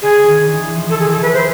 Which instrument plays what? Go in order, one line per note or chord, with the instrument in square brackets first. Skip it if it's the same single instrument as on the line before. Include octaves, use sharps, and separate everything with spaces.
[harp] D3 [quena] G#4
[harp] D#3
E3
E3
F3
[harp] D#3 [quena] A4
[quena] G#4
[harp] E3
[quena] A4
[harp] E3 [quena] B4
[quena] C5